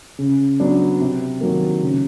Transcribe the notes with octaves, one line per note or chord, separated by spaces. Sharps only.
C#3
F#3 B3 D4
C3
D#3 F#3 A#3
C#3